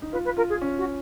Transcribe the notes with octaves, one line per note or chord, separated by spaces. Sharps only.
D#4
F4 B4
B4
F4 A#4
G#4
C#4
F#4